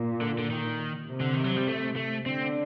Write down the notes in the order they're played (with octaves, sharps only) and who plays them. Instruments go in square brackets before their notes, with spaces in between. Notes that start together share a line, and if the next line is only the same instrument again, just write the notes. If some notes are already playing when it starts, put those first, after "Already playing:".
Already playing: [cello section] A#2
[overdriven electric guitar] D3
D3
D#3
[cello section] C3
[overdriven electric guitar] D3
D#3
F#3
G3
A3
A3
[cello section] D3 [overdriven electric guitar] C4